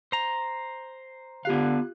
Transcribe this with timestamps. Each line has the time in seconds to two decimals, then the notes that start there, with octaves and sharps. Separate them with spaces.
0.12 C5 A#5
1.45 D3 B3 F4 G4 F5 F#6